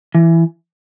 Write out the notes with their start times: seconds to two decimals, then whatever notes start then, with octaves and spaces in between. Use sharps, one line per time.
0.15 E3